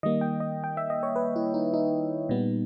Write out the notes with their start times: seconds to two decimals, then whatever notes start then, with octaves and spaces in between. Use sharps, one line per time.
0.03 D#3 G3 A#3 D#5
0.21 G5
0.40 D#5
0.64 G5
0.77 E5
0.90 D#5
1.03 C#5
1.16 B4
1.36 E4
1.54 D#4
1.74 D#4
2.29 A#2 G3 B3